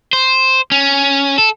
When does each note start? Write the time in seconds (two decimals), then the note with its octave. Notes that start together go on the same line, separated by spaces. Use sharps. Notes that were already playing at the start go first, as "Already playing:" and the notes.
0.13 C5
0.72 C#4
1.38 A4